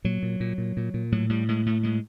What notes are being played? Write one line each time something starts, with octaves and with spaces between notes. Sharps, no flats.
A#2 F#3
A#2
A#2
A#2
A#2
A#2
A2 F#3
A2 G3
A2 G#3
A2 A3
A2 G#3